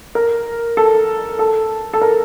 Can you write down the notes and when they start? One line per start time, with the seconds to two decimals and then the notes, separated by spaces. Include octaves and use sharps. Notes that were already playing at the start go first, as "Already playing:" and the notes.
0.15 A#4
0.77 A4
1.39 A4
1.94 A4
2.01 A#4